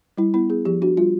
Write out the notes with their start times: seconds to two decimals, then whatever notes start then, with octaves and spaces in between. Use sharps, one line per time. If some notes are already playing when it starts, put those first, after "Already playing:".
0.18 G3 E4
0.34 B3 E4
0.50 B3 G#4
0.65 F3 G4
0.82 D4 F#4
0.97 G3 F4